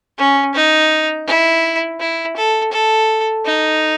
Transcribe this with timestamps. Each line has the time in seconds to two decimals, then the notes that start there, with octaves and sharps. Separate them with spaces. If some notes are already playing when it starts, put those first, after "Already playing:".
0.18 C#4
0.55 D#4
1.27 E4
2.00 E4
2.37 A4
2.72 A4
3.45 D#4